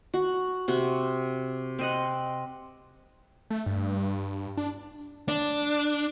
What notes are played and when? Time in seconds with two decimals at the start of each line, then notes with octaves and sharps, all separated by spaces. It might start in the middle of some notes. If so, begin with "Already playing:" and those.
0.14 F#4
0.68 C3 F#4 C#6
1.79 C4 D#5 F#5
3.50 A3
3.66 G2
4.57 D4
5.28 D4